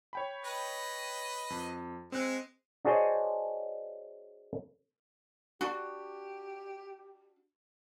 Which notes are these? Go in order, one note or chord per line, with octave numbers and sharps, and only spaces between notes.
C#5 G5 B5
B4 D#5
F2
G#3 C4 F#6
D4 F#4 G#4 C5 C#5 D#5
D4 F#4 G4